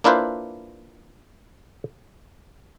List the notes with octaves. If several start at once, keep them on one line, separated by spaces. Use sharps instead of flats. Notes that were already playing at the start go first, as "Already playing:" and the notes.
A#3 D4 E4 F4 B4 C5